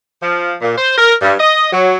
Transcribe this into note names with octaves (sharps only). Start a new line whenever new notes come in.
F3
A#2
C5
A#4
G2
D#5
F#3